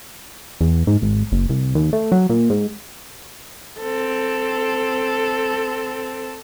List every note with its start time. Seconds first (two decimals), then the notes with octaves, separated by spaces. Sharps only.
0.61 E2
0.87 G#2
1.02 G#1
1.32 F#1
1.49 C2
1.75 D#2
1.93 A3
2.12 F#3
2.29 A#2
2.50 G#2
3.80 C4 A4